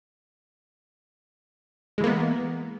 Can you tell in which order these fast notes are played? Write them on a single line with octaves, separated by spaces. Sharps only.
G#3 E3 A#3 B3